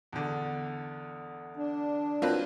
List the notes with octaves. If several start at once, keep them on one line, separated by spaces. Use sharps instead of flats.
E2 D3
D4
F#3 A#3 C4 F4 B4